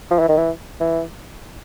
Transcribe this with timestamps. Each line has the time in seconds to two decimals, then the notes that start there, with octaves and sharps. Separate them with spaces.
0.11 F3
0.19 E3
0.29 D#3
0.37 E3
0.80 E3